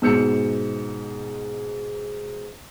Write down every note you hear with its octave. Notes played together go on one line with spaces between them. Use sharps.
G#2 B2 E6 G6 C#7